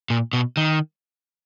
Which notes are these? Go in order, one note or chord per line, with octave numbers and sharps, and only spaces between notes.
A#2
B2
D#3